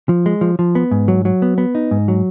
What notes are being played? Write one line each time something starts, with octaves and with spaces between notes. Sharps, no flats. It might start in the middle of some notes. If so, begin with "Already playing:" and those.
F3
G#3
F3
F3
B3
G#2
F#3
F#3
B3
B3
D#4
G#2
F#3